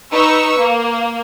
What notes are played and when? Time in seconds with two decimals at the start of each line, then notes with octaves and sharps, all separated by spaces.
0.13 D#4 B4 C#6 E6
0.60 A#3